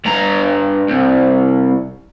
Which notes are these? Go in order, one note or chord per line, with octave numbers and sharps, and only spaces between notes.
G2 A#5
C2